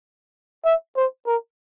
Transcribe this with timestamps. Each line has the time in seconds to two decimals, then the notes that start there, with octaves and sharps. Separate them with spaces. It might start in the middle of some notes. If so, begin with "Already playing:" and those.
0.65 E5
0.96 C5
1.27 A#4